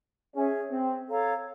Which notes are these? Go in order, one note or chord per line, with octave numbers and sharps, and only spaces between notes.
C#4 G#4 C#5 E5
C4
A4 C#5 F5 A#5